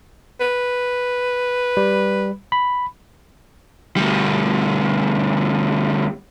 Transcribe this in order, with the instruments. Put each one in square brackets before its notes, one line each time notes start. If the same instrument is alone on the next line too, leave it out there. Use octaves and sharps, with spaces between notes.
[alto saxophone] B4
[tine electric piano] G3
B5
[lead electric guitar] D2 G3